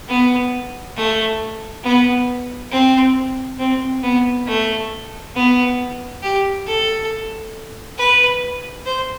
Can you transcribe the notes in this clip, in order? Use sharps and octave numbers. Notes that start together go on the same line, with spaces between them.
B3
A3
B3
C4
C4
B3
A3
B3
G4
A4
B4
C5